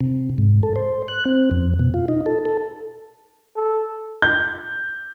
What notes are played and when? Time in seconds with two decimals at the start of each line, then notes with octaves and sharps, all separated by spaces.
0.01 C3
0.38 G#2
0.63 A4
0.76 C5
1.08 F#6
1.25 C4
1.51 F2
1.79 B2
1.94 F4
2.08 D#4
2.26 A4
2.45 A4
3.56 A4
4.22 G6